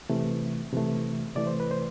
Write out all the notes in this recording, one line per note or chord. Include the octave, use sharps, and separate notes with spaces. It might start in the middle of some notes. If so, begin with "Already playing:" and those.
C3 E3 A3
C3 E3 A3
C3 E3 A3 D5
C5
B4
C5